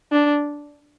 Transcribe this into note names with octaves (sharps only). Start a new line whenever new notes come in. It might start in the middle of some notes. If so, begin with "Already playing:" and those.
D4